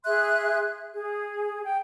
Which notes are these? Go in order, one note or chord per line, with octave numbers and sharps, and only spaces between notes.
G#4 E5 C6 F#6
G#4
G5